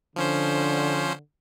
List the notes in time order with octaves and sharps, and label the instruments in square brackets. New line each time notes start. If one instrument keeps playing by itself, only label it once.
[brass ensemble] D3 [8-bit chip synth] F3 C#4 C5